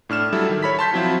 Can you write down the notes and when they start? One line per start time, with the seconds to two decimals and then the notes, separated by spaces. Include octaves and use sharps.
0.09 A2 D4 F6 E7
0.32 F#3 G3 E4 A4
0.49 D#3
0.63 C#5 B5 B6
0.79 A5 C6 G6 B6
0.93 F3 F#3 C4 E4 F4